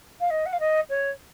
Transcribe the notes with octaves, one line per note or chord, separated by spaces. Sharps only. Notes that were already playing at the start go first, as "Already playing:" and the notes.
F5
D#5
F#5
F5
D#5
C#5